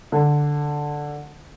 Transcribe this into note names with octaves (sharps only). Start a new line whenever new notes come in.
D3